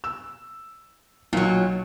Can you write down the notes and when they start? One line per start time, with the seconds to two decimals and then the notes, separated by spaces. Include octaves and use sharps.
0.04 E6
1.33 B1 A#2 F#3